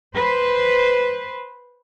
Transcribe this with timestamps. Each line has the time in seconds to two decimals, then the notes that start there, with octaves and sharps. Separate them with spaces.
0.15 B4 C5